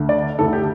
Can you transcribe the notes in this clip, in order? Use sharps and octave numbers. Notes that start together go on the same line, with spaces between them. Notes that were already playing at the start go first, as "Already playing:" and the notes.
Already playing: D2 D3 A3
D5
D2 D3 A3 A4
G4